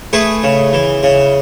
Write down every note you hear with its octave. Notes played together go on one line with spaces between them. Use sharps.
A3 G#4 B4
C#3
E3
C#3